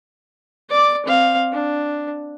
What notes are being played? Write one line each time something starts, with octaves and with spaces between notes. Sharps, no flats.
D5 D6
C4 F5
D4